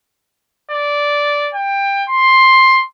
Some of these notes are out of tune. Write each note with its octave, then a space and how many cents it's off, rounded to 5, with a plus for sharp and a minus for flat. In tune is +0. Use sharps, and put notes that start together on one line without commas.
D5 -10
G5 +20
C6 +10